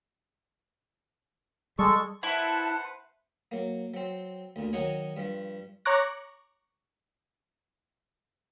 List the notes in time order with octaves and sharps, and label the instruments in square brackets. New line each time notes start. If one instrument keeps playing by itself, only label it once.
[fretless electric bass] G3 [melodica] G#3 A4 C#6
[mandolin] E4 [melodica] B4 C5 F#5 [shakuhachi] A5
[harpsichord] F#3 A#3
F#3 C4
D2 A#2
D#3 F#3 D#4 F#4 C#5
G2 F3
[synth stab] C#5 A#5 C#6 D6 F#6 A#6